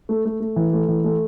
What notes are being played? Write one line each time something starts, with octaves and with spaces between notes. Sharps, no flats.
A3
A3
A3
E3
A3
E3
A3